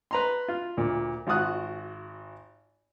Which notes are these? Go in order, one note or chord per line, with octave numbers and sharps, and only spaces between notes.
B4 A#5 C6
F4
D2 A#2
G#1 F4 F#4 D#6 F#6